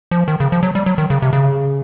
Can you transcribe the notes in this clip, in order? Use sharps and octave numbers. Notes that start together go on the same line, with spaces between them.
F3
D#3
C#3
F3
F#3
G3
F#3
D#3
C#3
C3
C#3